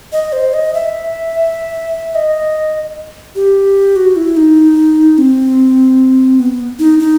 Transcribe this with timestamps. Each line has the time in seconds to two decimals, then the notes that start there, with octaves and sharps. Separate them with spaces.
0.13 D#5
0.33 C5
0.54 D#5
0.74 E5
2.15 D#5
3.35 G4
3.96 F#4
4.16 E4
4.37 D#4
5.18 C4
6.39 B3
6.79 D#4
6.99 D#4